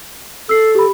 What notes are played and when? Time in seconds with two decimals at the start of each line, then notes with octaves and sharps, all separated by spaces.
0.49 A4 E6 C7
0.75 G4 B5